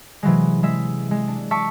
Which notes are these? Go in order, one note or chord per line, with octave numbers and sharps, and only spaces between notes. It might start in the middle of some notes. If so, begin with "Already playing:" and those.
C3 E3 F#3 G#3
G#3 E5
G#3
D4
E5 A5 C#6 D6